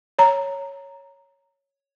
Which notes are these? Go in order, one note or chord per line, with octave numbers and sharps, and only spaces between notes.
C#5 A#5